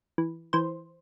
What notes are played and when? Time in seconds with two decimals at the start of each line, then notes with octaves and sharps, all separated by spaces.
0.18 E3
0.53 E3 C5